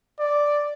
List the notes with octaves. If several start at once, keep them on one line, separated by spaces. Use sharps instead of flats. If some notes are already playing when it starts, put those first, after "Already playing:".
D5